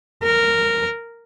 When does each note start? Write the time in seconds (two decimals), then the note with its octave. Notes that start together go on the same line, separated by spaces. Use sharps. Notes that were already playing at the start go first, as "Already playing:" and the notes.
0.23 A#4